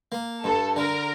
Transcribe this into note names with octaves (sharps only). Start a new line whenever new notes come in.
A#3
G2 A4
D3 A#4